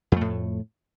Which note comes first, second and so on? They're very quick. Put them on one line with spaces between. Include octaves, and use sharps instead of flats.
F2 A3 A2